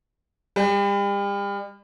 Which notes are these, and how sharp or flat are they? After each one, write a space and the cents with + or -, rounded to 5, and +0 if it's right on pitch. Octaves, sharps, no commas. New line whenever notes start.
G3 +40